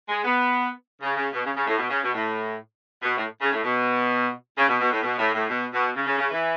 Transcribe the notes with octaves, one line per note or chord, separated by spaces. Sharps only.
G#3
B3
C#3
C#3
B2
C#3
C#3
A2
B2
C#3
B2
A2
B2
A2
C#3
A2
B2
C#3
B2
B2
A2
B2
A2
A2
B2
B2
C#3
C#3
C#3
E3